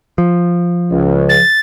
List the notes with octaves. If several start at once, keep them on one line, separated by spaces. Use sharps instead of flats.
F3
C#2
A6